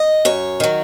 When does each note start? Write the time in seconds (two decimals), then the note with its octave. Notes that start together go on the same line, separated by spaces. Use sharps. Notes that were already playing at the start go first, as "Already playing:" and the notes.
Already playing: D#5
0.25 F#2 C#5
0.60 D#3 F#3